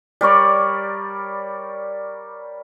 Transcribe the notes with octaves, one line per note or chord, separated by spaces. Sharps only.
G3 A#4 C#5 D5